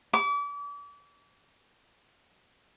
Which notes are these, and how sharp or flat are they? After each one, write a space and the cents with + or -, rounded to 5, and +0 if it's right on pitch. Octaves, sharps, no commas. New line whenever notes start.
D6 -35